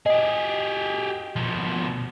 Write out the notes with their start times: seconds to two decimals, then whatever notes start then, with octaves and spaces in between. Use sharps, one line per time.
0.06 G4 G#4 D#5
1.36 B2 F3